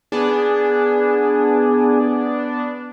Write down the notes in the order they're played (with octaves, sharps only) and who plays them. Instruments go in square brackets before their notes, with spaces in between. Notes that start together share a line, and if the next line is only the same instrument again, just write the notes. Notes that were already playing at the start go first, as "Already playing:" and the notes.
[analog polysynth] B3 D4 [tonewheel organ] G#4